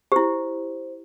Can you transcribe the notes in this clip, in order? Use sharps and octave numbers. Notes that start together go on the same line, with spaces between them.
E4 G4 C5